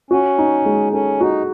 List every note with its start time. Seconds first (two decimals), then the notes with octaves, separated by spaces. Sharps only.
0.10 C#4 F#4
0.39 D#4
0.66 G#3
0.93 C#4 A4
1.20 D#4 F#4